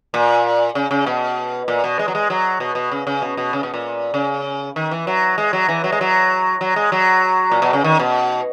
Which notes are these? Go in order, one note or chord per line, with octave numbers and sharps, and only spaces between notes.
A#2
C#3
C#3
B2
A#2
B2
G#3
F#3
G#3
F#3
B2
B2
C#3
C#3
B2
B2
C#3
B2
A#2
C#3
D#3
E3
F#3
G#3
F#3
E3
F#3
G#3
F#3
F#3
G#3
F#3
A#2
B2
C#3
D#3
B2